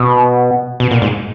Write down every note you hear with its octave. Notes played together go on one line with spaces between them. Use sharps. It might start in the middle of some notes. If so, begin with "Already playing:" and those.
Already playing: B2
B2
A#2
G#2